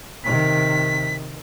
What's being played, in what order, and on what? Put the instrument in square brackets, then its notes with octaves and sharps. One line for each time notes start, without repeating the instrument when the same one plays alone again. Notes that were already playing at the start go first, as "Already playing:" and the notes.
[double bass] C3 D#3 [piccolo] B6